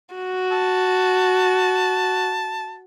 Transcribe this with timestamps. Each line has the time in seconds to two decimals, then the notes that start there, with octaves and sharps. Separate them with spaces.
0.14 F#4
0.52 A5